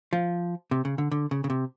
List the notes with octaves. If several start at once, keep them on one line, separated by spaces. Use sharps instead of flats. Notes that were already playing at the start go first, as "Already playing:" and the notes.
F3
C3
C#3
D3
D3
C#3
C#3
C3